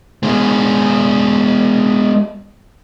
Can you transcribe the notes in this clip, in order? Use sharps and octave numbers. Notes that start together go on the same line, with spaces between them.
G#3 B3